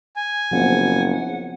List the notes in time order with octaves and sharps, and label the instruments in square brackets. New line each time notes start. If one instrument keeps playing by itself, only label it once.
[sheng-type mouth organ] G#5
[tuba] F#1 [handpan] F3 B3 C4 [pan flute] F#5